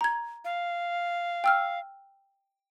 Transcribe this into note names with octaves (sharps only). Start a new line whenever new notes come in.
A#5 G#6
F5
G5 E6 F6